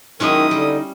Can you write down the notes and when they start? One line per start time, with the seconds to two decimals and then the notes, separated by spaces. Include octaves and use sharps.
0.20 D#3 F#3 G#3 C#4 D#4 E4 D#6
0.51 D3 G3